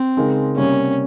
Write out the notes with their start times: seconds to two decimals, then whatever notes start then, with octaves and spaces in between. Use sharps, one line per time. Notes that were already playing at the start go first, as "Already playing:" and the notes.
Already playing: C4
0.17 C#3 G#3 D#4 A#4
0.56 C3 G3 A#3 C#4